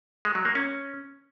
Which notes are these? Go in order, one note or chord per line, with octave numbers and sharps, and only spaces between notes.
G#3
F#3
A#3
C#4